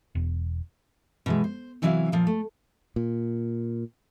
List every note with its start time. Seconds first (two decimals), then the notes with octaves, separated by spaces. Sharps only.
0.15 E1
1.26 B2 E3 G#3
1.44 C5
1.82 C3 E3 F#3 E4 D5 F5
2.12 A#2 F3 F4
2.27 A3
2.96 A#2